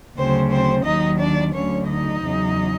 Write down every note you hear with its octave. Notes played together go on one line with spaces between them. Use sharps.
D2 C#3 F#3 C4 C5
C4 C5
D#2 D#3 F#3 D#4 D#5
D4 D5
D2 D3 F#3 C#4 C#5
D#4 D#5
E2 C#3 F#3